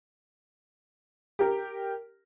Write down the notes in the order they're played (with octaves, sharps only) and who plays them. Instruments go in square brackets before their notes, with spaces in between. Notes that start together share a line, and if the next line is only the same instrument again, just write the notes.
[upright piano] G4 A#4